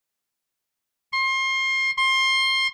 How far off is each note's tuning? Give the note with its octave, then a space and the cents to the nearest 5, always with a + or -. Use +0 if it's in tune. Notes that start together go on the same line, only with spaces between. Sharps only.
C6 +30
C6 +25